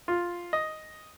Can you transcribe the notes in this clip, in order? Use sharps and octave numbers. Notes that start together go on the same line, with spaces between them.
F4
D#5